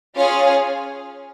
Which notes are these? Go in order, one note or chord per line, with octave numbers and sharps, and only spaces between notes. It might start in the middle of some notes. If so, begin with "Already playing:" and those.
C#4 F4 G#4 C#5 F5